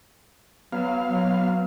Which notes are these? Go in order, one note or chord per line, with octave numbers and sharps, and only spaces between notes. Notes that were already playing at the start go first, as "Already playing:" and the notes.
F#3 B3 F5
F#3